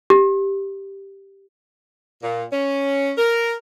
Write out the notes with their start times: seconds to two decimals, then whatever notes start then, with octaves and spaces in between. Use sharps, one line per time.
0.10 G4
2.22 A#2
2.52 C#4
3.17 A#4